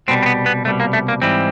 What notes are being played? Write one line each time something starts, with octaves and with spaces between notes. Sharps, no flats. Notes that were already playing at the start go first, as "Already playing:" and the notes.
C2 B2 G3 C4
C4
B3
B3
C2 B2 G3 A3
A#3
A3
A#3
G#2 E3 G3 C4